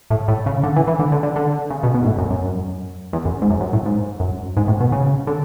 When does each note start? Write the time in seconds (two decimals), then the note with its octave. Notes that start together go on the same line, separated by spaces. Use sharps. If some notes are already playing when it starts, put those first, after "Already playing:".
0.10 A2
0.28 A2
0.46 C#3
0.63 D3
0.76 E3
0.87 E3
0.99 D3
1.12 D3
1.23 D3
1.36 D3
1.70 C#3
1.83 B2
1.94 B2
2.02 G#2
2.06 A2
2.18 F#2
2.30 F#2
3.13 E2
3.25 F#2
3.41 G#2
3.50 F#2
3.61 F#2
3.73 A2
3.85 G#2
4.20 F#2
4.57 G#2
4.68 A2
4.81 B2
4.92 C#3
5.27 D3